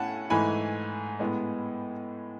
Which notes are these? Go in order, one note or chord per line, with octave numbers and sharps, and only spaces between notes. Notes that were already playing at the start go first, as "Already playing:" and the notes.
Already playing: A2 A3 C#4 F#5 G#5 A5
G#2 E3 A3 G#5 B5
A2 G#3 B3